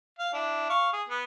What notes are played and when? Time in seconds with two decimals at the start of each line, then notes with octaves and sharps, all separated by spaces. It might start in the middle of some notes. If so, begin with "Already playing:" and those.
0.19 F5
0.33 D4 E4
0.70 F5 C#6
0.93 G#4
1.09 B3